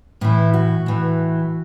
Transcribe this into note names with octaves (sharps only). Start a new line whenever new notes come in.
A2 E3 E4
F#4
A2 E3